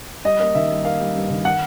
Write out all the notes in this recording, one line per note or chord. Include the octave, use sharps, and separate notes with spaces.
G3 D#5
A#3 D#5
D#3 E5
G3
A#3 F5
G3
G2
D#3
F#5